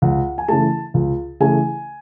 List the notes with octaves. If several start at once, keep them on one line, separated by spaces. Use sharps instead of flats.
C#2 F#5
G#5
C#3 E3 A3 A5
C#2
C#3 E3 A3 G#5